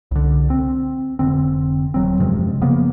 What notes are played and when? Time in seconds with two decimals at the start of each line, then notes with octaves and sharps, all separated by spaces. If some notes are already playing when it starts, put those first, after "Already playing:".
0.11 C2 D3
0.50 C4
1.19 F1 B1 D3 C4
1.94 D#1 F#3 C4
2.19 F#2 C3 F3 G#3
2.62 C#3 F3 A#3 B3